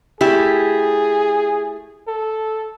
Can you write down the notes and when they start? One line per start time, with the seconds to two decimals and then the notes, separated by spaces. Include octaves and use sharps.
0.21 A3 E4 G4 G#4
2.08 A4